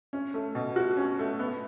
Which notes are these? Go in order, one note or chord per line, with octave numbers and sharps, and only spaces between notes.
C#4
A3
B2
F#4
C#4
A3
B3